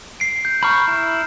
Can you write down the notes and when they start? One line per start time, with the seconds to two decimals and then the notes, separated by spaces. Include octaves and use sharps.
0.20 C7 D7
0.45 G6
0.63 A#5 B5 C#6 F6 G6
0.88 E4